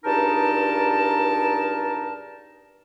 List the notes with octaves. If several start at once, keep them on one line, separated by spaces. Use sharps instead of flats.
C#2 G2 D#4 A#4 A5